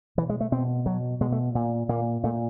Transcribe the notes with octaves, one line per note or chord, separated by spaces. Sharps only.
B2 E3
G#3
A3
B2 C4
B2 F#3
B2 G#3
A3
A#2
A#2 A#3
A#2 A3